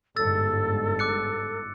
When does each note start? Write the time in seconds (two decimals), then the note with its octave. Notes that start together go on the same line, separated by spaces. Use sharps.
0.16 G1 G#2 A4 E6 A6
0.99 D6 F#6 C#7